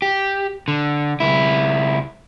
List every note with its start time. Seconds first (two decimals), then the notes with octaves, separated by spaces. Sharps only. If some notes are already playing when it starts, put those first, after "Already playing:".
0.02 G4
0.68 D3
1.20 C#2 E4